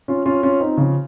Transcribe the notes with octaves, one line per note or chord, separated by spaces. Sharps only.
C#4 F4
C#4 F4
C#4 F4
C4 D#4
C#3 F3